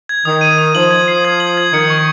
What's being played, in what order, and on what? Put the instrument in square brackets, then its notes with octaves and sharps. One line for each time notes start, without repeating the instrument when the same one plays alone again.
[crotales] G#6
[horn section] D#3 [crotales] D#6
[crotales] D#7
D#6
[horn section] F3 [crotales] F#7
[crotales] G#6
C7
G#6
F#7
G#6
[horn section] D#3 [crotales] C#7
[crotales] C#6